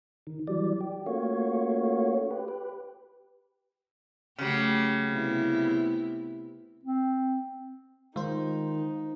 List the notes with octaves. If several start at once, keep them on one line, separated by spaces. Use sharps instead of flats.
D#3
E3 F#3 G3 D5
G4
A3 A#3 C#4 F4 F#4 C#5
G4 B4
G4 B4
C#3 F#3 A3 G4
C3 B3 E4
C4
D#3 G#3 D#4 F4 C5